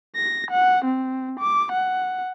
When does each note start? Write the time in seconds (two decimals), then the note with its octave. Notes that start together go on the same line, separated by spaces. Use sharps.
0.15 A#6
0.51 F#5
0.85 C4
1.39 D6
1.72 F#5